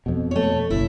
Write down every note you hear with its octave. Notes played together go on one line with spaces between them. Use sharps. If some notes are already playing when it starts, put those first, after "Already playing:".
F2 B2
A3 C#5
F#1 B1 E4